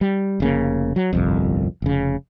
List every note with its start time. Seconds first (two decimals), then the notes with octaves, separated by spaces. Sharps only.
0.01 G3
0.40 F1 C#3 A#3
0.96 F#3
1.13 G1 C2 F2
1.82 F1 C#3